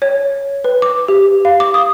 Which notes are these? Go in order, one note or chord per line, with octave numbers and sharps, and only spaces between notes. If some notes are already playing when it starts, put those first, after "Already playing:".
C#5
B4
D6
G4
F5
D6
D#6